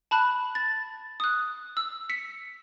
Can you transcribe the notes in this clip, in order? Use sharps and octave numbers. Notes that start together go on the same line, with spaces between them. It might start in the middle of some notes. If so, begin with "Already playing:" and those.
A5 B5 F#6
A6
D#6 F#6
E6
B6 C#7